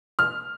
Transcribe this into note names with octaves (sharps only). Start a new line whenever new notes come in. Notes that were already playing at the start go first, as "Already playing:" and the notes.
F6